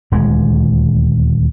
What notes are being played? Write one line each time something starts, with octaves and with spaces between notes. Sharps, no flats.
D#1 D2 G#3